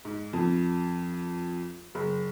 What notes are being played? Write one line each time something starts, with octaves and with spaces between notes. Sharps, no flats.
G#2
F2
F#1